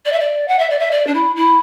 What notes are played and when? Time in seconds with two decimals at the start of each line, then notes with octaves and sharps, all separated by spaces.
0.05 D5
0.12 E5
0.20 D5
0.48 F#5
0.59 E5
0.70 D5
0.79 E5
0.91 D5
1.07 D4
1.14 E4
1.36 E4